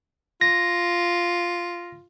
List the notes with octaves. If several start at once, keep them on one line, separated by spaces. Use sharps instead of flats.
F4 A#6